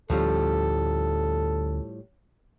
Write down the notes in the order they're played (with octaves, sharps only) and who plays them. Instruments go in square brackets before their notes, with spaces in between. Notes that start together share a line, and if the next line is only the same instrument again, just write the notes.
[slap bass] D2 C#4 [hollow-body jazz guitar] A2 F3 G3 [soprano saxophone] A4